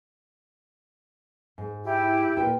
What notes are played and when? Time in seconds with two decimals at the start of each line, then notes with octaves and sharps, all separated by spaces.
1.58 G#2
1.84 E4 G4
2.37 A#2 B4 G5